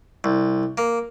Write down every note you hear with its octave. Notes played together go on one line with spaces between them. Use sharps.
C2
A#3